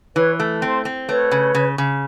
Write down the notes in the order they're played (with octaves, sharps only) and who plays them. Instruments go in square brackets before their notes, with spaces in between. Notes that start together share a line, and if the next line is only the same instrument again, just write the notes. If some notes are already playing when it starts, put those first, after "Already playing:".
[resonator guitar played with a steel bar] E3 [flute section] B4 C#5
[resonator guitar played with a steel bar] A3
[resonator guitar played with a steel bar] C4 [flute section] C5
[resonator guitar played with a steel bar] C4
[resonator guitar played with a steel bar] A3 [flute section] B4 C#5
[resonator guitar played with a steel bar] C#3
C#3
C#3